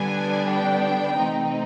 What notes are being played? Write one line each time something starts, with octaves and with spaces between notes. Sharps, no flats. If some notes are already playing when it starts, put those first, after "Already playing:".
Already playing: D3 G3 B3 D4 G#5
G5
C3 E3 A3 C4 D#4